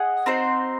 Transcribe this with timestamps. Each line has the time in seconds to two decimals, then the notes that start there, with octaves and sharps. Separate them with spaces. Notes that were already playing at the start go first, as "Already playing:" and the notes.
Already playing: G#4 D#5 F#5
0.26 C4 D#4 F#4 C5